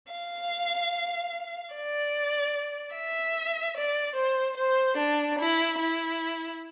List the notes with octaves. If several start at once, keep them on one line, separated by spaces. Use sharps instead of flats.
F5
D5
E5
D5
C5
C5
D4
E4
E4